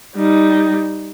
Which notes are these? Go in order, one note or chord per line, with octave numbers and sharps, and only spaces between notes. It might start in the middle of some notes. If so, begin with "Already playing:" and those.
G3 D#4